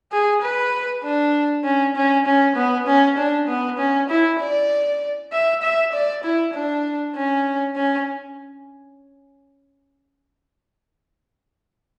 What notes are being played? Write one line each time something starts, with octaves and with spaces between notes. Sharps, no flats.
G#4
B4
D4
C#4
C#4
C#4
B3
C#4
D4
B3
C#4
E4
D5
E5
E5
D5
E4
D4
C#4
C#4